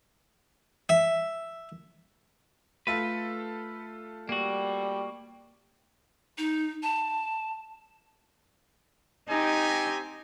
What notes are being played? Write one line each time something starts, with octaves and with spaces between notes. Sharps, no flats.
E5
A3 F4 A4 B4
G3 A#3 F#4
D#4
A5
C4 D#4 G4 G#5